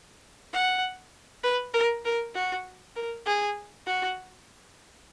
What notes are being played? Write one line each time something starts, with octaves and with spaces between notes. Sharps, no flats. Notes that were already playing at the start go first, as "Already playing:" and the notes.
F#5
B4
A#4
A#4
F#4
A#4
G#4
F#4